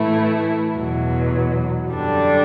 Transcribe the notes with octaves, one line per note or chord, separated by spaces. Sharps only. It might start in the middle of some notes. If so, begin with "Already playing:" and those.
Already playing: A2 E3 A3 E4
E2 B2 F#3
F#2 D3 G3 D4